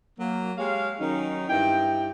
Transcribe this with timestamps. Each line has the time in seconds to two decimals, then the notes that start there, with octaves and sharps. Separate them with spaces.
0.19 F#3 A#3
0.58 G#3 G4 C#5 F5
1.00 D#3 F#3 C#4 D#4
1.49 G2 E4 G5